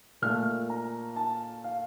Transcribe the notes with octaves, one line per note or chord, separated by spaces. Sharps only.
A#2 A3 F6
A#5
A5
F5